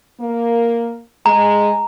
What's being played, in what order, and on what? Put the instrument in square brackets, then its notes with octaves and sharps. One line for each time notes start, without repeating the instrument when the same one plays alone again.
[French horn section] A#3
[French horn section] G#3 [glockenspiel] A#5